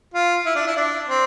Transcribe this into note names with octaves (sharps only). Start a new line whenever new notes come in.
F4
E4
D4
E4
D4
C4